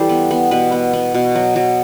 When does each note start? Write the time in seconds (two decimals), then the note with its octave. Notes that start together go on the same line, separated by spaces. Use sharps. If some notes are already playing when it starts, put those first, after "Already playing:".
Already playing: E3 G3 G4 A4 C5
0.09 B3
0.31 B3
0.51 B2 B4
0.72 B3
0.93 B3
1.14 B2
1.35 F#3
1.56 F#3